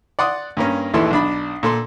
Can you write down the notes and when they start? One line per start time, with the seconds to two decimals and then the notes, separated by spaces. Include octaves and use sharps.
0.19 D5 F#5 C6 D#6
0.57 G2 A#3 C#4
0.94 A#1 D#2 E3 E4 A4 C6
1.11 B1 D4 B5
1.63 A#2 A4 C6